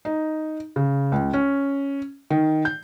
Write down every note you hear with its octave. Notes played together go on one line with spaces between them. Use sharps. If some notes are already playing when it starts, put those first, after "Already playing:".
D#4
C#3
C#2
C#4
D#3
G6